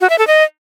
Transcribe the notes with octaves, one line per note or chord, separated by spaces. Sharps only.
F#4
E5
A4
D#5